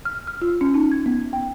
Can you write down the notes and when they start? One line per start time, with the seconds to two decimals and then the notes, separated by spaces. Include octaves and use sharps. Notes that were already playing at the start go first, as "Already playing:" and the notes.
0.05 F6
0.27 F6
0.42 F4
0.61 C#4
0.74 D#4
0.92 G#6
1.06 B3
1.33 G5